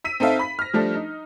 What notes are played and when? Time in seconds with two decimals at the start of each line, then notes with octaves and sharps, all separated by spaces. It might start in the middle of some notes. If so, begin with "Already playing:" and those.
0.04 E6 B6 D#7
0.20 C4 D#4 A4 E5 F5
0.39 B5 B6
0.59 F6 A#6
0.74 F3 G3 A3 D4
0.95 D#4